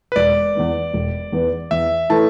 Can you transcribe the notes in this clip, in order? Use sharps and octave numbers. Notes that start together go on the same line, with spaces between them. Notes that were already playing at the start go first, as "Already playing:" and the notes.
B4
E1 D5
E2 E3 B3
E1
E2 E3 B3
E2 E5
E3 A3 E4 A4 A5